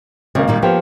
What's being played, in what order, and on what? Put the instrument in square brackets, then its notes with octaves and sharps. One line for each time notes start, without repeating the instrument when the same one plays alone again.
[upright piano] G#1 A#3 [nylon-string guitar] C#3
[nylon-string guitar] A#2 D#3 G3
[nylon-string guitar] F3 [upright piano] A#3 B3 G4